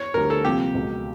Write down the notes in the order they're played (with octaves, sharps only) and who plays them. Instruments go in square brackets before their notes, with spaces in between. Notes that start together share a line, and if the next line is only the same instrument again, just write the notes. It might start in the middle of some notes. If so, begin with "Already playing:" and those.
Already playing: [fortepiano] C#5
[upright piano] D2 D3 G3 [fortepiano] A#4
[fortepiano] A4
[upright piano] C2 C3 F3 A#3 [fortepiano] G4
[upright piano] C#2 B2 F#3